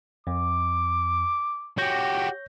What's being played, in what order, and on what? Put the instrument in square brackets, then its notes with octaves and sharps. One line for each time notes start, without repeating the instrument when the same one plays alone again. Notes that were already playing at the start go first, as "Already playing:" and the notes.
[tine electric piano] F2 [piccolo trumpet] D6
[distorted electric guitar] F#4 G4 [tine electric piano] C#5 G6 A#6